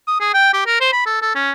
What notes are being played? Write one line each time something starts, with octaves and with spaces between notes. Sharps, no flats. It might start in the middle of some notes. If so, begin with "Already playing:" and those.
D#6
G#4
G5
G4
A#4
C5
B5
A4
A4
C#4